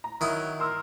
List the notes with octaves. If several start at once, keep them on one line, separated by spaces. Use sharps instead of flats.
A#5
D#3 F#3 E4 D#6
A#4 C6 E6